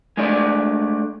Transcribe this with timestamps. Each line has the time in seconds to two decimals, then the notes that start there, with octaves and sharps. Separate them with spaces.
0.17 G#3 A3 D4 D5